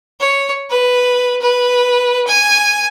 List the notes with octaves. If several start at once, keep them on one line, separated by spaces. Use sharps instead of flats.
C#5
B4
B4
G#5